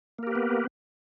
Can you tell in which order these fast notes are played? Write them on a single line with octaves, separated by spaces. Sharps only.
A#3 A#4 G4 B4 B3